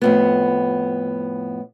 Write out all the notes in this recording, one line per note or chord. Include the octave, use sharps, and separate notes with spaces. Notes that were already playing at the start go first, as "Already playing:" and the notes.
F2 A2 B3